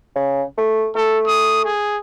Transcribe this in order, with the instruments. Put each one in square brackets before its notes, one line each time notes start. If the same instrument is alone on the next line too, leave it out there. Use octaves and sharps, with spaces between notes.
[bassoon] C#3
A3
[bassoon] A3 [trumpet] A4
[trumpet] D#6
G#4